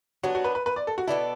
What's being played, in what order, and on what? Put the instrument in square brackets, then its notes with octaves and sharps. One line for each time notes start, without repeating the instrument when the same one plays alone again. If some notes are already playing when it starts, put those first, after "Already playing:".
[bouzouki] F#3 B3 D4 [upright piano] F#4
[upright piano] F#4
B4
B4
B4
D5
A4
F#4
[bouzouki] B2 B3 D4 A4 [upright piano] E4